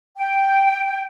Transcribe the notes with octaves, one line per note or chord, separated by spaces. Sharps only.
G5